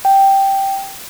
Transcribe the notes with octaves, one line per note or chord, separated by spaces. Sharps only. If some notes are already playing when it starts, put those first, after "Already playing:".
G5